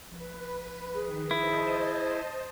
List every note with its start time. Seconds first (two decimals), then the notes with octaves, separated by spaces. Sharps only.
0.11 A#1 B4
0.94 D#3 G#4
1.31 E4 C5 D#5 A5